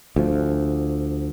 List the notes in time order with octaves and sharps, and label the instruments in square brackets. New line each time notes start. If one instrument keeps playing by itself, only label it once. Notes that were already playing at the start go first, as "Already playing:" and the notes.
[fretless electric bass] D2 F3